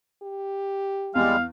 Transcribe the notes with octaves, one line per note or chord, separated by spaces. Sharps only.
G4
E2 G3 G#3 F5